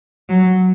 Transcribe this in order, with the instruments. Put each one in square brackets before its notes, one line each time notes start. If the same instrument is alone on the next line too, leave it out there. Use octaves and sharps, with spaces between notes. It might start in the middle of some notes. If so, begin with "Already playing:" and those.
[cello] F#3